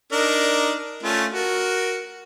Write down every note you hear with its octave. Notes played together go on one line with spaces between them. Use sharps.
D4 D#4 A#4
A3 C#4 F4
F#4 A#4